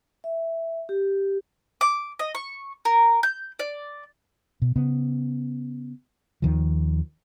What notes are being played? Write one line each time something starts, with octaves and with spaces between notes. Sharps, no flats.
E5
G4
D6
D#5
C#6
A#4
G6
D5
B2
C#3 B3
D#2 D#3 F3